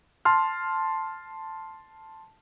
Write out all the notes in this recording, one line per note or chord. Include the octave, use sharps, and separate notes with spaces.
A5 C6 F6